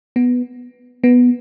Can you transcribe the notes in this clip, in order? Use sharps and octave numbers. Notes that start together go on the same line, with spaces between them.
B3
B3